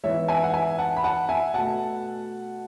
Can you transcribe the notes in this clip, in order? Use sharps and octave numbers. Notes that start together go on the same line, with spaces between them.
G#2 E3 B3 C#5 E5
E5 G#5
F#5
E5 G#5
F#5 A5
B5
F#5 A5
E5 G#5
B2 A3 F#5 A5